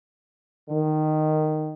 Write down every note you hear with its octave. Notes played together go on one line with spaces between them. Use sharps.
D#3